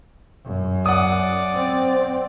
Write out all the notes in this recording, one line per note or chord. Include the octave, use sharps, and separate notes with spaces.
F#2
D5 F#5 D#6
C4